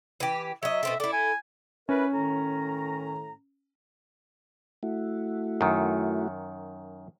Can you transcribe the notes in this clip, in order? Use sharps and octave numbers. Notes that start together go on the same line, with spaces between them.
E3 G4
F#3 D#5 E5
B2 C4 A4
E4 A4 D5
G#5
C#4 E4 A#4 B4
A2 D#3 A#5
A3 E4 F#4
F#2 D#3